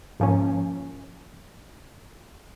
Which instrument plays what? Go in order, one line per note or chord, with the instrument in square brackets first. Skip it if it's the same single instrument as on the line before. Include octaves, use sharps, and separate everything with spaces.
[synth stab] G#2 F3 A#3 C#4